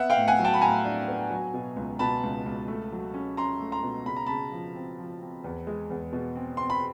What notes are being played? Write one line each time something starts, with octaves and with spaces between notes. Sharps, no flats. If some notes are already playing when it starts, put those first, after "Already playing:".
Already playing: B3 E5 F#5
F5 G5
A2
F#5 G#5
F#3
G5 A5
B5
A2 G#5 A#5
D4
B3
F#3
B2
C#2
B2 A5 B5
C#2
C#2
A3
F#3
C#4
C#4 A#5 C6
A3
A#5 C6
B2
C#3 B5
A#5
C#3 A5 B5
F3
C4
F3
C4
E2
G#3
E2
B2
C4
C4 C6
B5